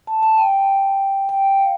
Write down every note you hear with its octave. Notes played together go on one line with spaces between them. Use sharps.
A5
A5
G5
G5
F5